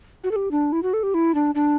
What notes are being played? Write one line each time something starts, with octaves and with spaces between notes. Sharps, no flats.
F#4
A4
G4
D4
E4
F#4
A4
G4
E4
D4
D4